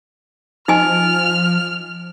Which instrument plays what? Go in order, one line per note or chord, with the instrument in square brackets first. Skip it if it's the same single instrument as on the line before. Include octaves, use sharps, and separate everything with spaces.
[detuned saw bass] F3 [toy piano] D#4 D#5 G#5 [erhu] F6